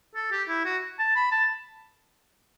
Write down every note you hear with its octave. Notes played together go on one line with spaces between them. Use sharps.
A4
G4
E4
F#4
A5
B5
A5